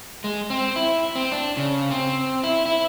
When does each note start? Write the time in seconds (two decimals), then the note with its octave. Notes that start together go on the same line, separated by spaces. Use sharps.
0.24 G#3
0.50 C4
0.76 E4
1.16 C4
1.32 D4
1.57 C#3
1.91 C4
2.43 E4
2.66 E4